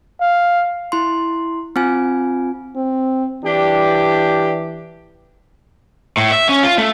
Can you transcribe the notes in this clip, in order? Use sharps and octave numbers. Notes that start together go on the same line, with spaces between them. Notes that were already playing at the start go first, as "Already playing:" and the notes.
F5
E4 C6
C4 F4 G#5
C4
E3 D4 G4
A2
E5
C#4
F4
A3